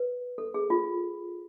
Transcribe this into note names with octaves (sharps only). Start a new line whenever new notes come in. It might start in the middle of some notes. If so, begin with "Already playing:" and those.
Already playing: B4
A4
G#4
F4